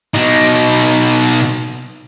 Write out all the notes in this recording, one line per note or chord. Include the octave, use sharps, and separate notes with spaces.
B2 D#4